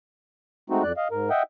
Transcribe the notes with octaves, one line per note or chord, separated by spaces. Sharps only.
G#3 A3 C4 D#4 F#4
F2 D5 F#6
D#5 F5
G#2 A#4
D#5 E5 F#5 G5